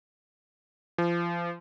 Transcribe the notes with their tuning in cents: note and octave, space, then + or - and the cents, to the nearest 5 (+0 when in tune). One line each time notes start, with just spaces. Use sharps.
F3 -30